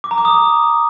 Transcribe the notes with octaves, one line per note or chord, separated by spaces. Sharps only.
D6
A#5
D6
D#6